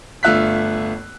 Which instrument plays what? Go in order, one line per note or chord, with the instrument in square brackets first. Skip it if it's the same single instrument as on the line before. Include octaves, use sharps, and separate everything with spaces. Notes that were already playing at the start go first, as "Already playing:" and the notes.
[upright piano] G1 A3 F4 E5 F#6 B6